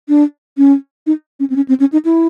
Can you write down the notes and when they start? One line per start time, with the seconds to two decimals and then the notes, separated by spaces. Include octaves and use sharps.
0.09 D4
0.58 C#4
1.07 D#4
1.40 C#4
1.50 C4
1.56 C#4
1.69 C4
1.80 C#4
1.92 D#4
2.05 E4